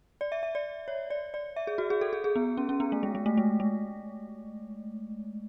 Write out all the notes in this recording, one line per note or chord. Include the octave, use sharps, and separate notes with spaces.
D5
E5
E5
D5
C#5
D5
D5
E5
G#4
F#4
G#4
A4
G#4
G#4
B3
C#4
C#4
B3
A3
G#3
G#3
A3
G#3
G#3